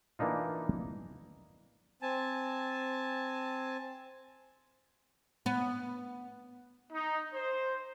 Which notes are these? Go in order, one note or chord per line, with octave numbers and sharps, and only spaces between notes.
E3 A#3 D4 D#4 F4
C4 G#5 A5
B3
D#4
C5